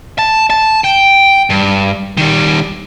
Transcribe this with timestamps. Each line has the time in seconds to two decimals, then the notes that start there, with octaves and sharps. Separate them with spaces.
0.19 A5
0.50 A5
0.84 G5
1.50 G2
2.17 D#3 G3